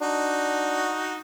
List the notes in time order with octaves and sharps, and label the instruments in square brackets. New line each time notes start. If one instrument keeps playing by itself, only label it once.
[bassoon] D4 [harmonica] D#4 F#4